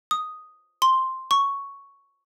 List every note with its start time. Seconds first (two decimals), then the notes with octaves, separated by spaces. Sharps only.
0.11 D#6
0.82 C6
1.31 C#6